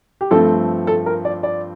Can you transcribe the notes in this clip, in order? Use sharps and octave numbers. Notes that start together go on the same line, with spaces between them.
G4
G2 F3 A3 C4 A4
A4
A#4
D5
D5